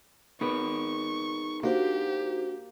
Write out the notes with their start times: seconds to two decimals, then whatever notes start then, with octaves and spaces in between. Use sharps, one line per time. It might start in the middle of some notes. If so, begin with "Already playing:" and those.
0.41 B3 D#4 G#4 A#4 C#6
1.63 A#3 D4 F#4 G4 C5